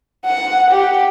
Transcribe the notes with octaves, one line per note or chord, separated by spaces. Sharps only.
F#5
G4